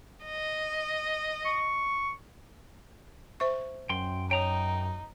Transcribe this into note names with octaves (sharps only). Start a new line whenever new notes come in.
D#5
C#6
C5 E5 C#6
F#2 G5 C6
D#4 C#5 G5 A#5 D#6